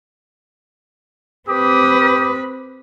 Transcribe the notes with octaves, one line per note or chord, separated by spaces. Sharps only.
C4 G4 B4 D6 D#6